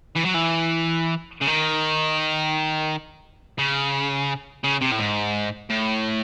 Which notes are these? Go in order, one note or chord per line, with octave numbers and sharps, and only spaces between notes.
E3
F#3
E3
C#3
D#3
C#3
C#3
C3
A2
G#2
A2